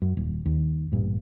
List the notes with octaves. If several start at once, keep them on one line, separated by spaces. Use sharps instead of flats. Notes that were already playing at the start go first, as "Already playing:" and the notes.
F#2
D#1
D#2
A1 G2 A#2